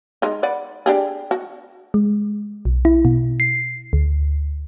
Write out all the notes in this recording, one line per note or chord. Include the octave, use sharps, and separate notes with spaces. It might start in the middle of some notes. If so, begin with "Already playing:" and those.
G#3 D#4
B4 D5 F#5
D4 G4 G#4
F#4
G#3
B1
E4
B2
C7
D2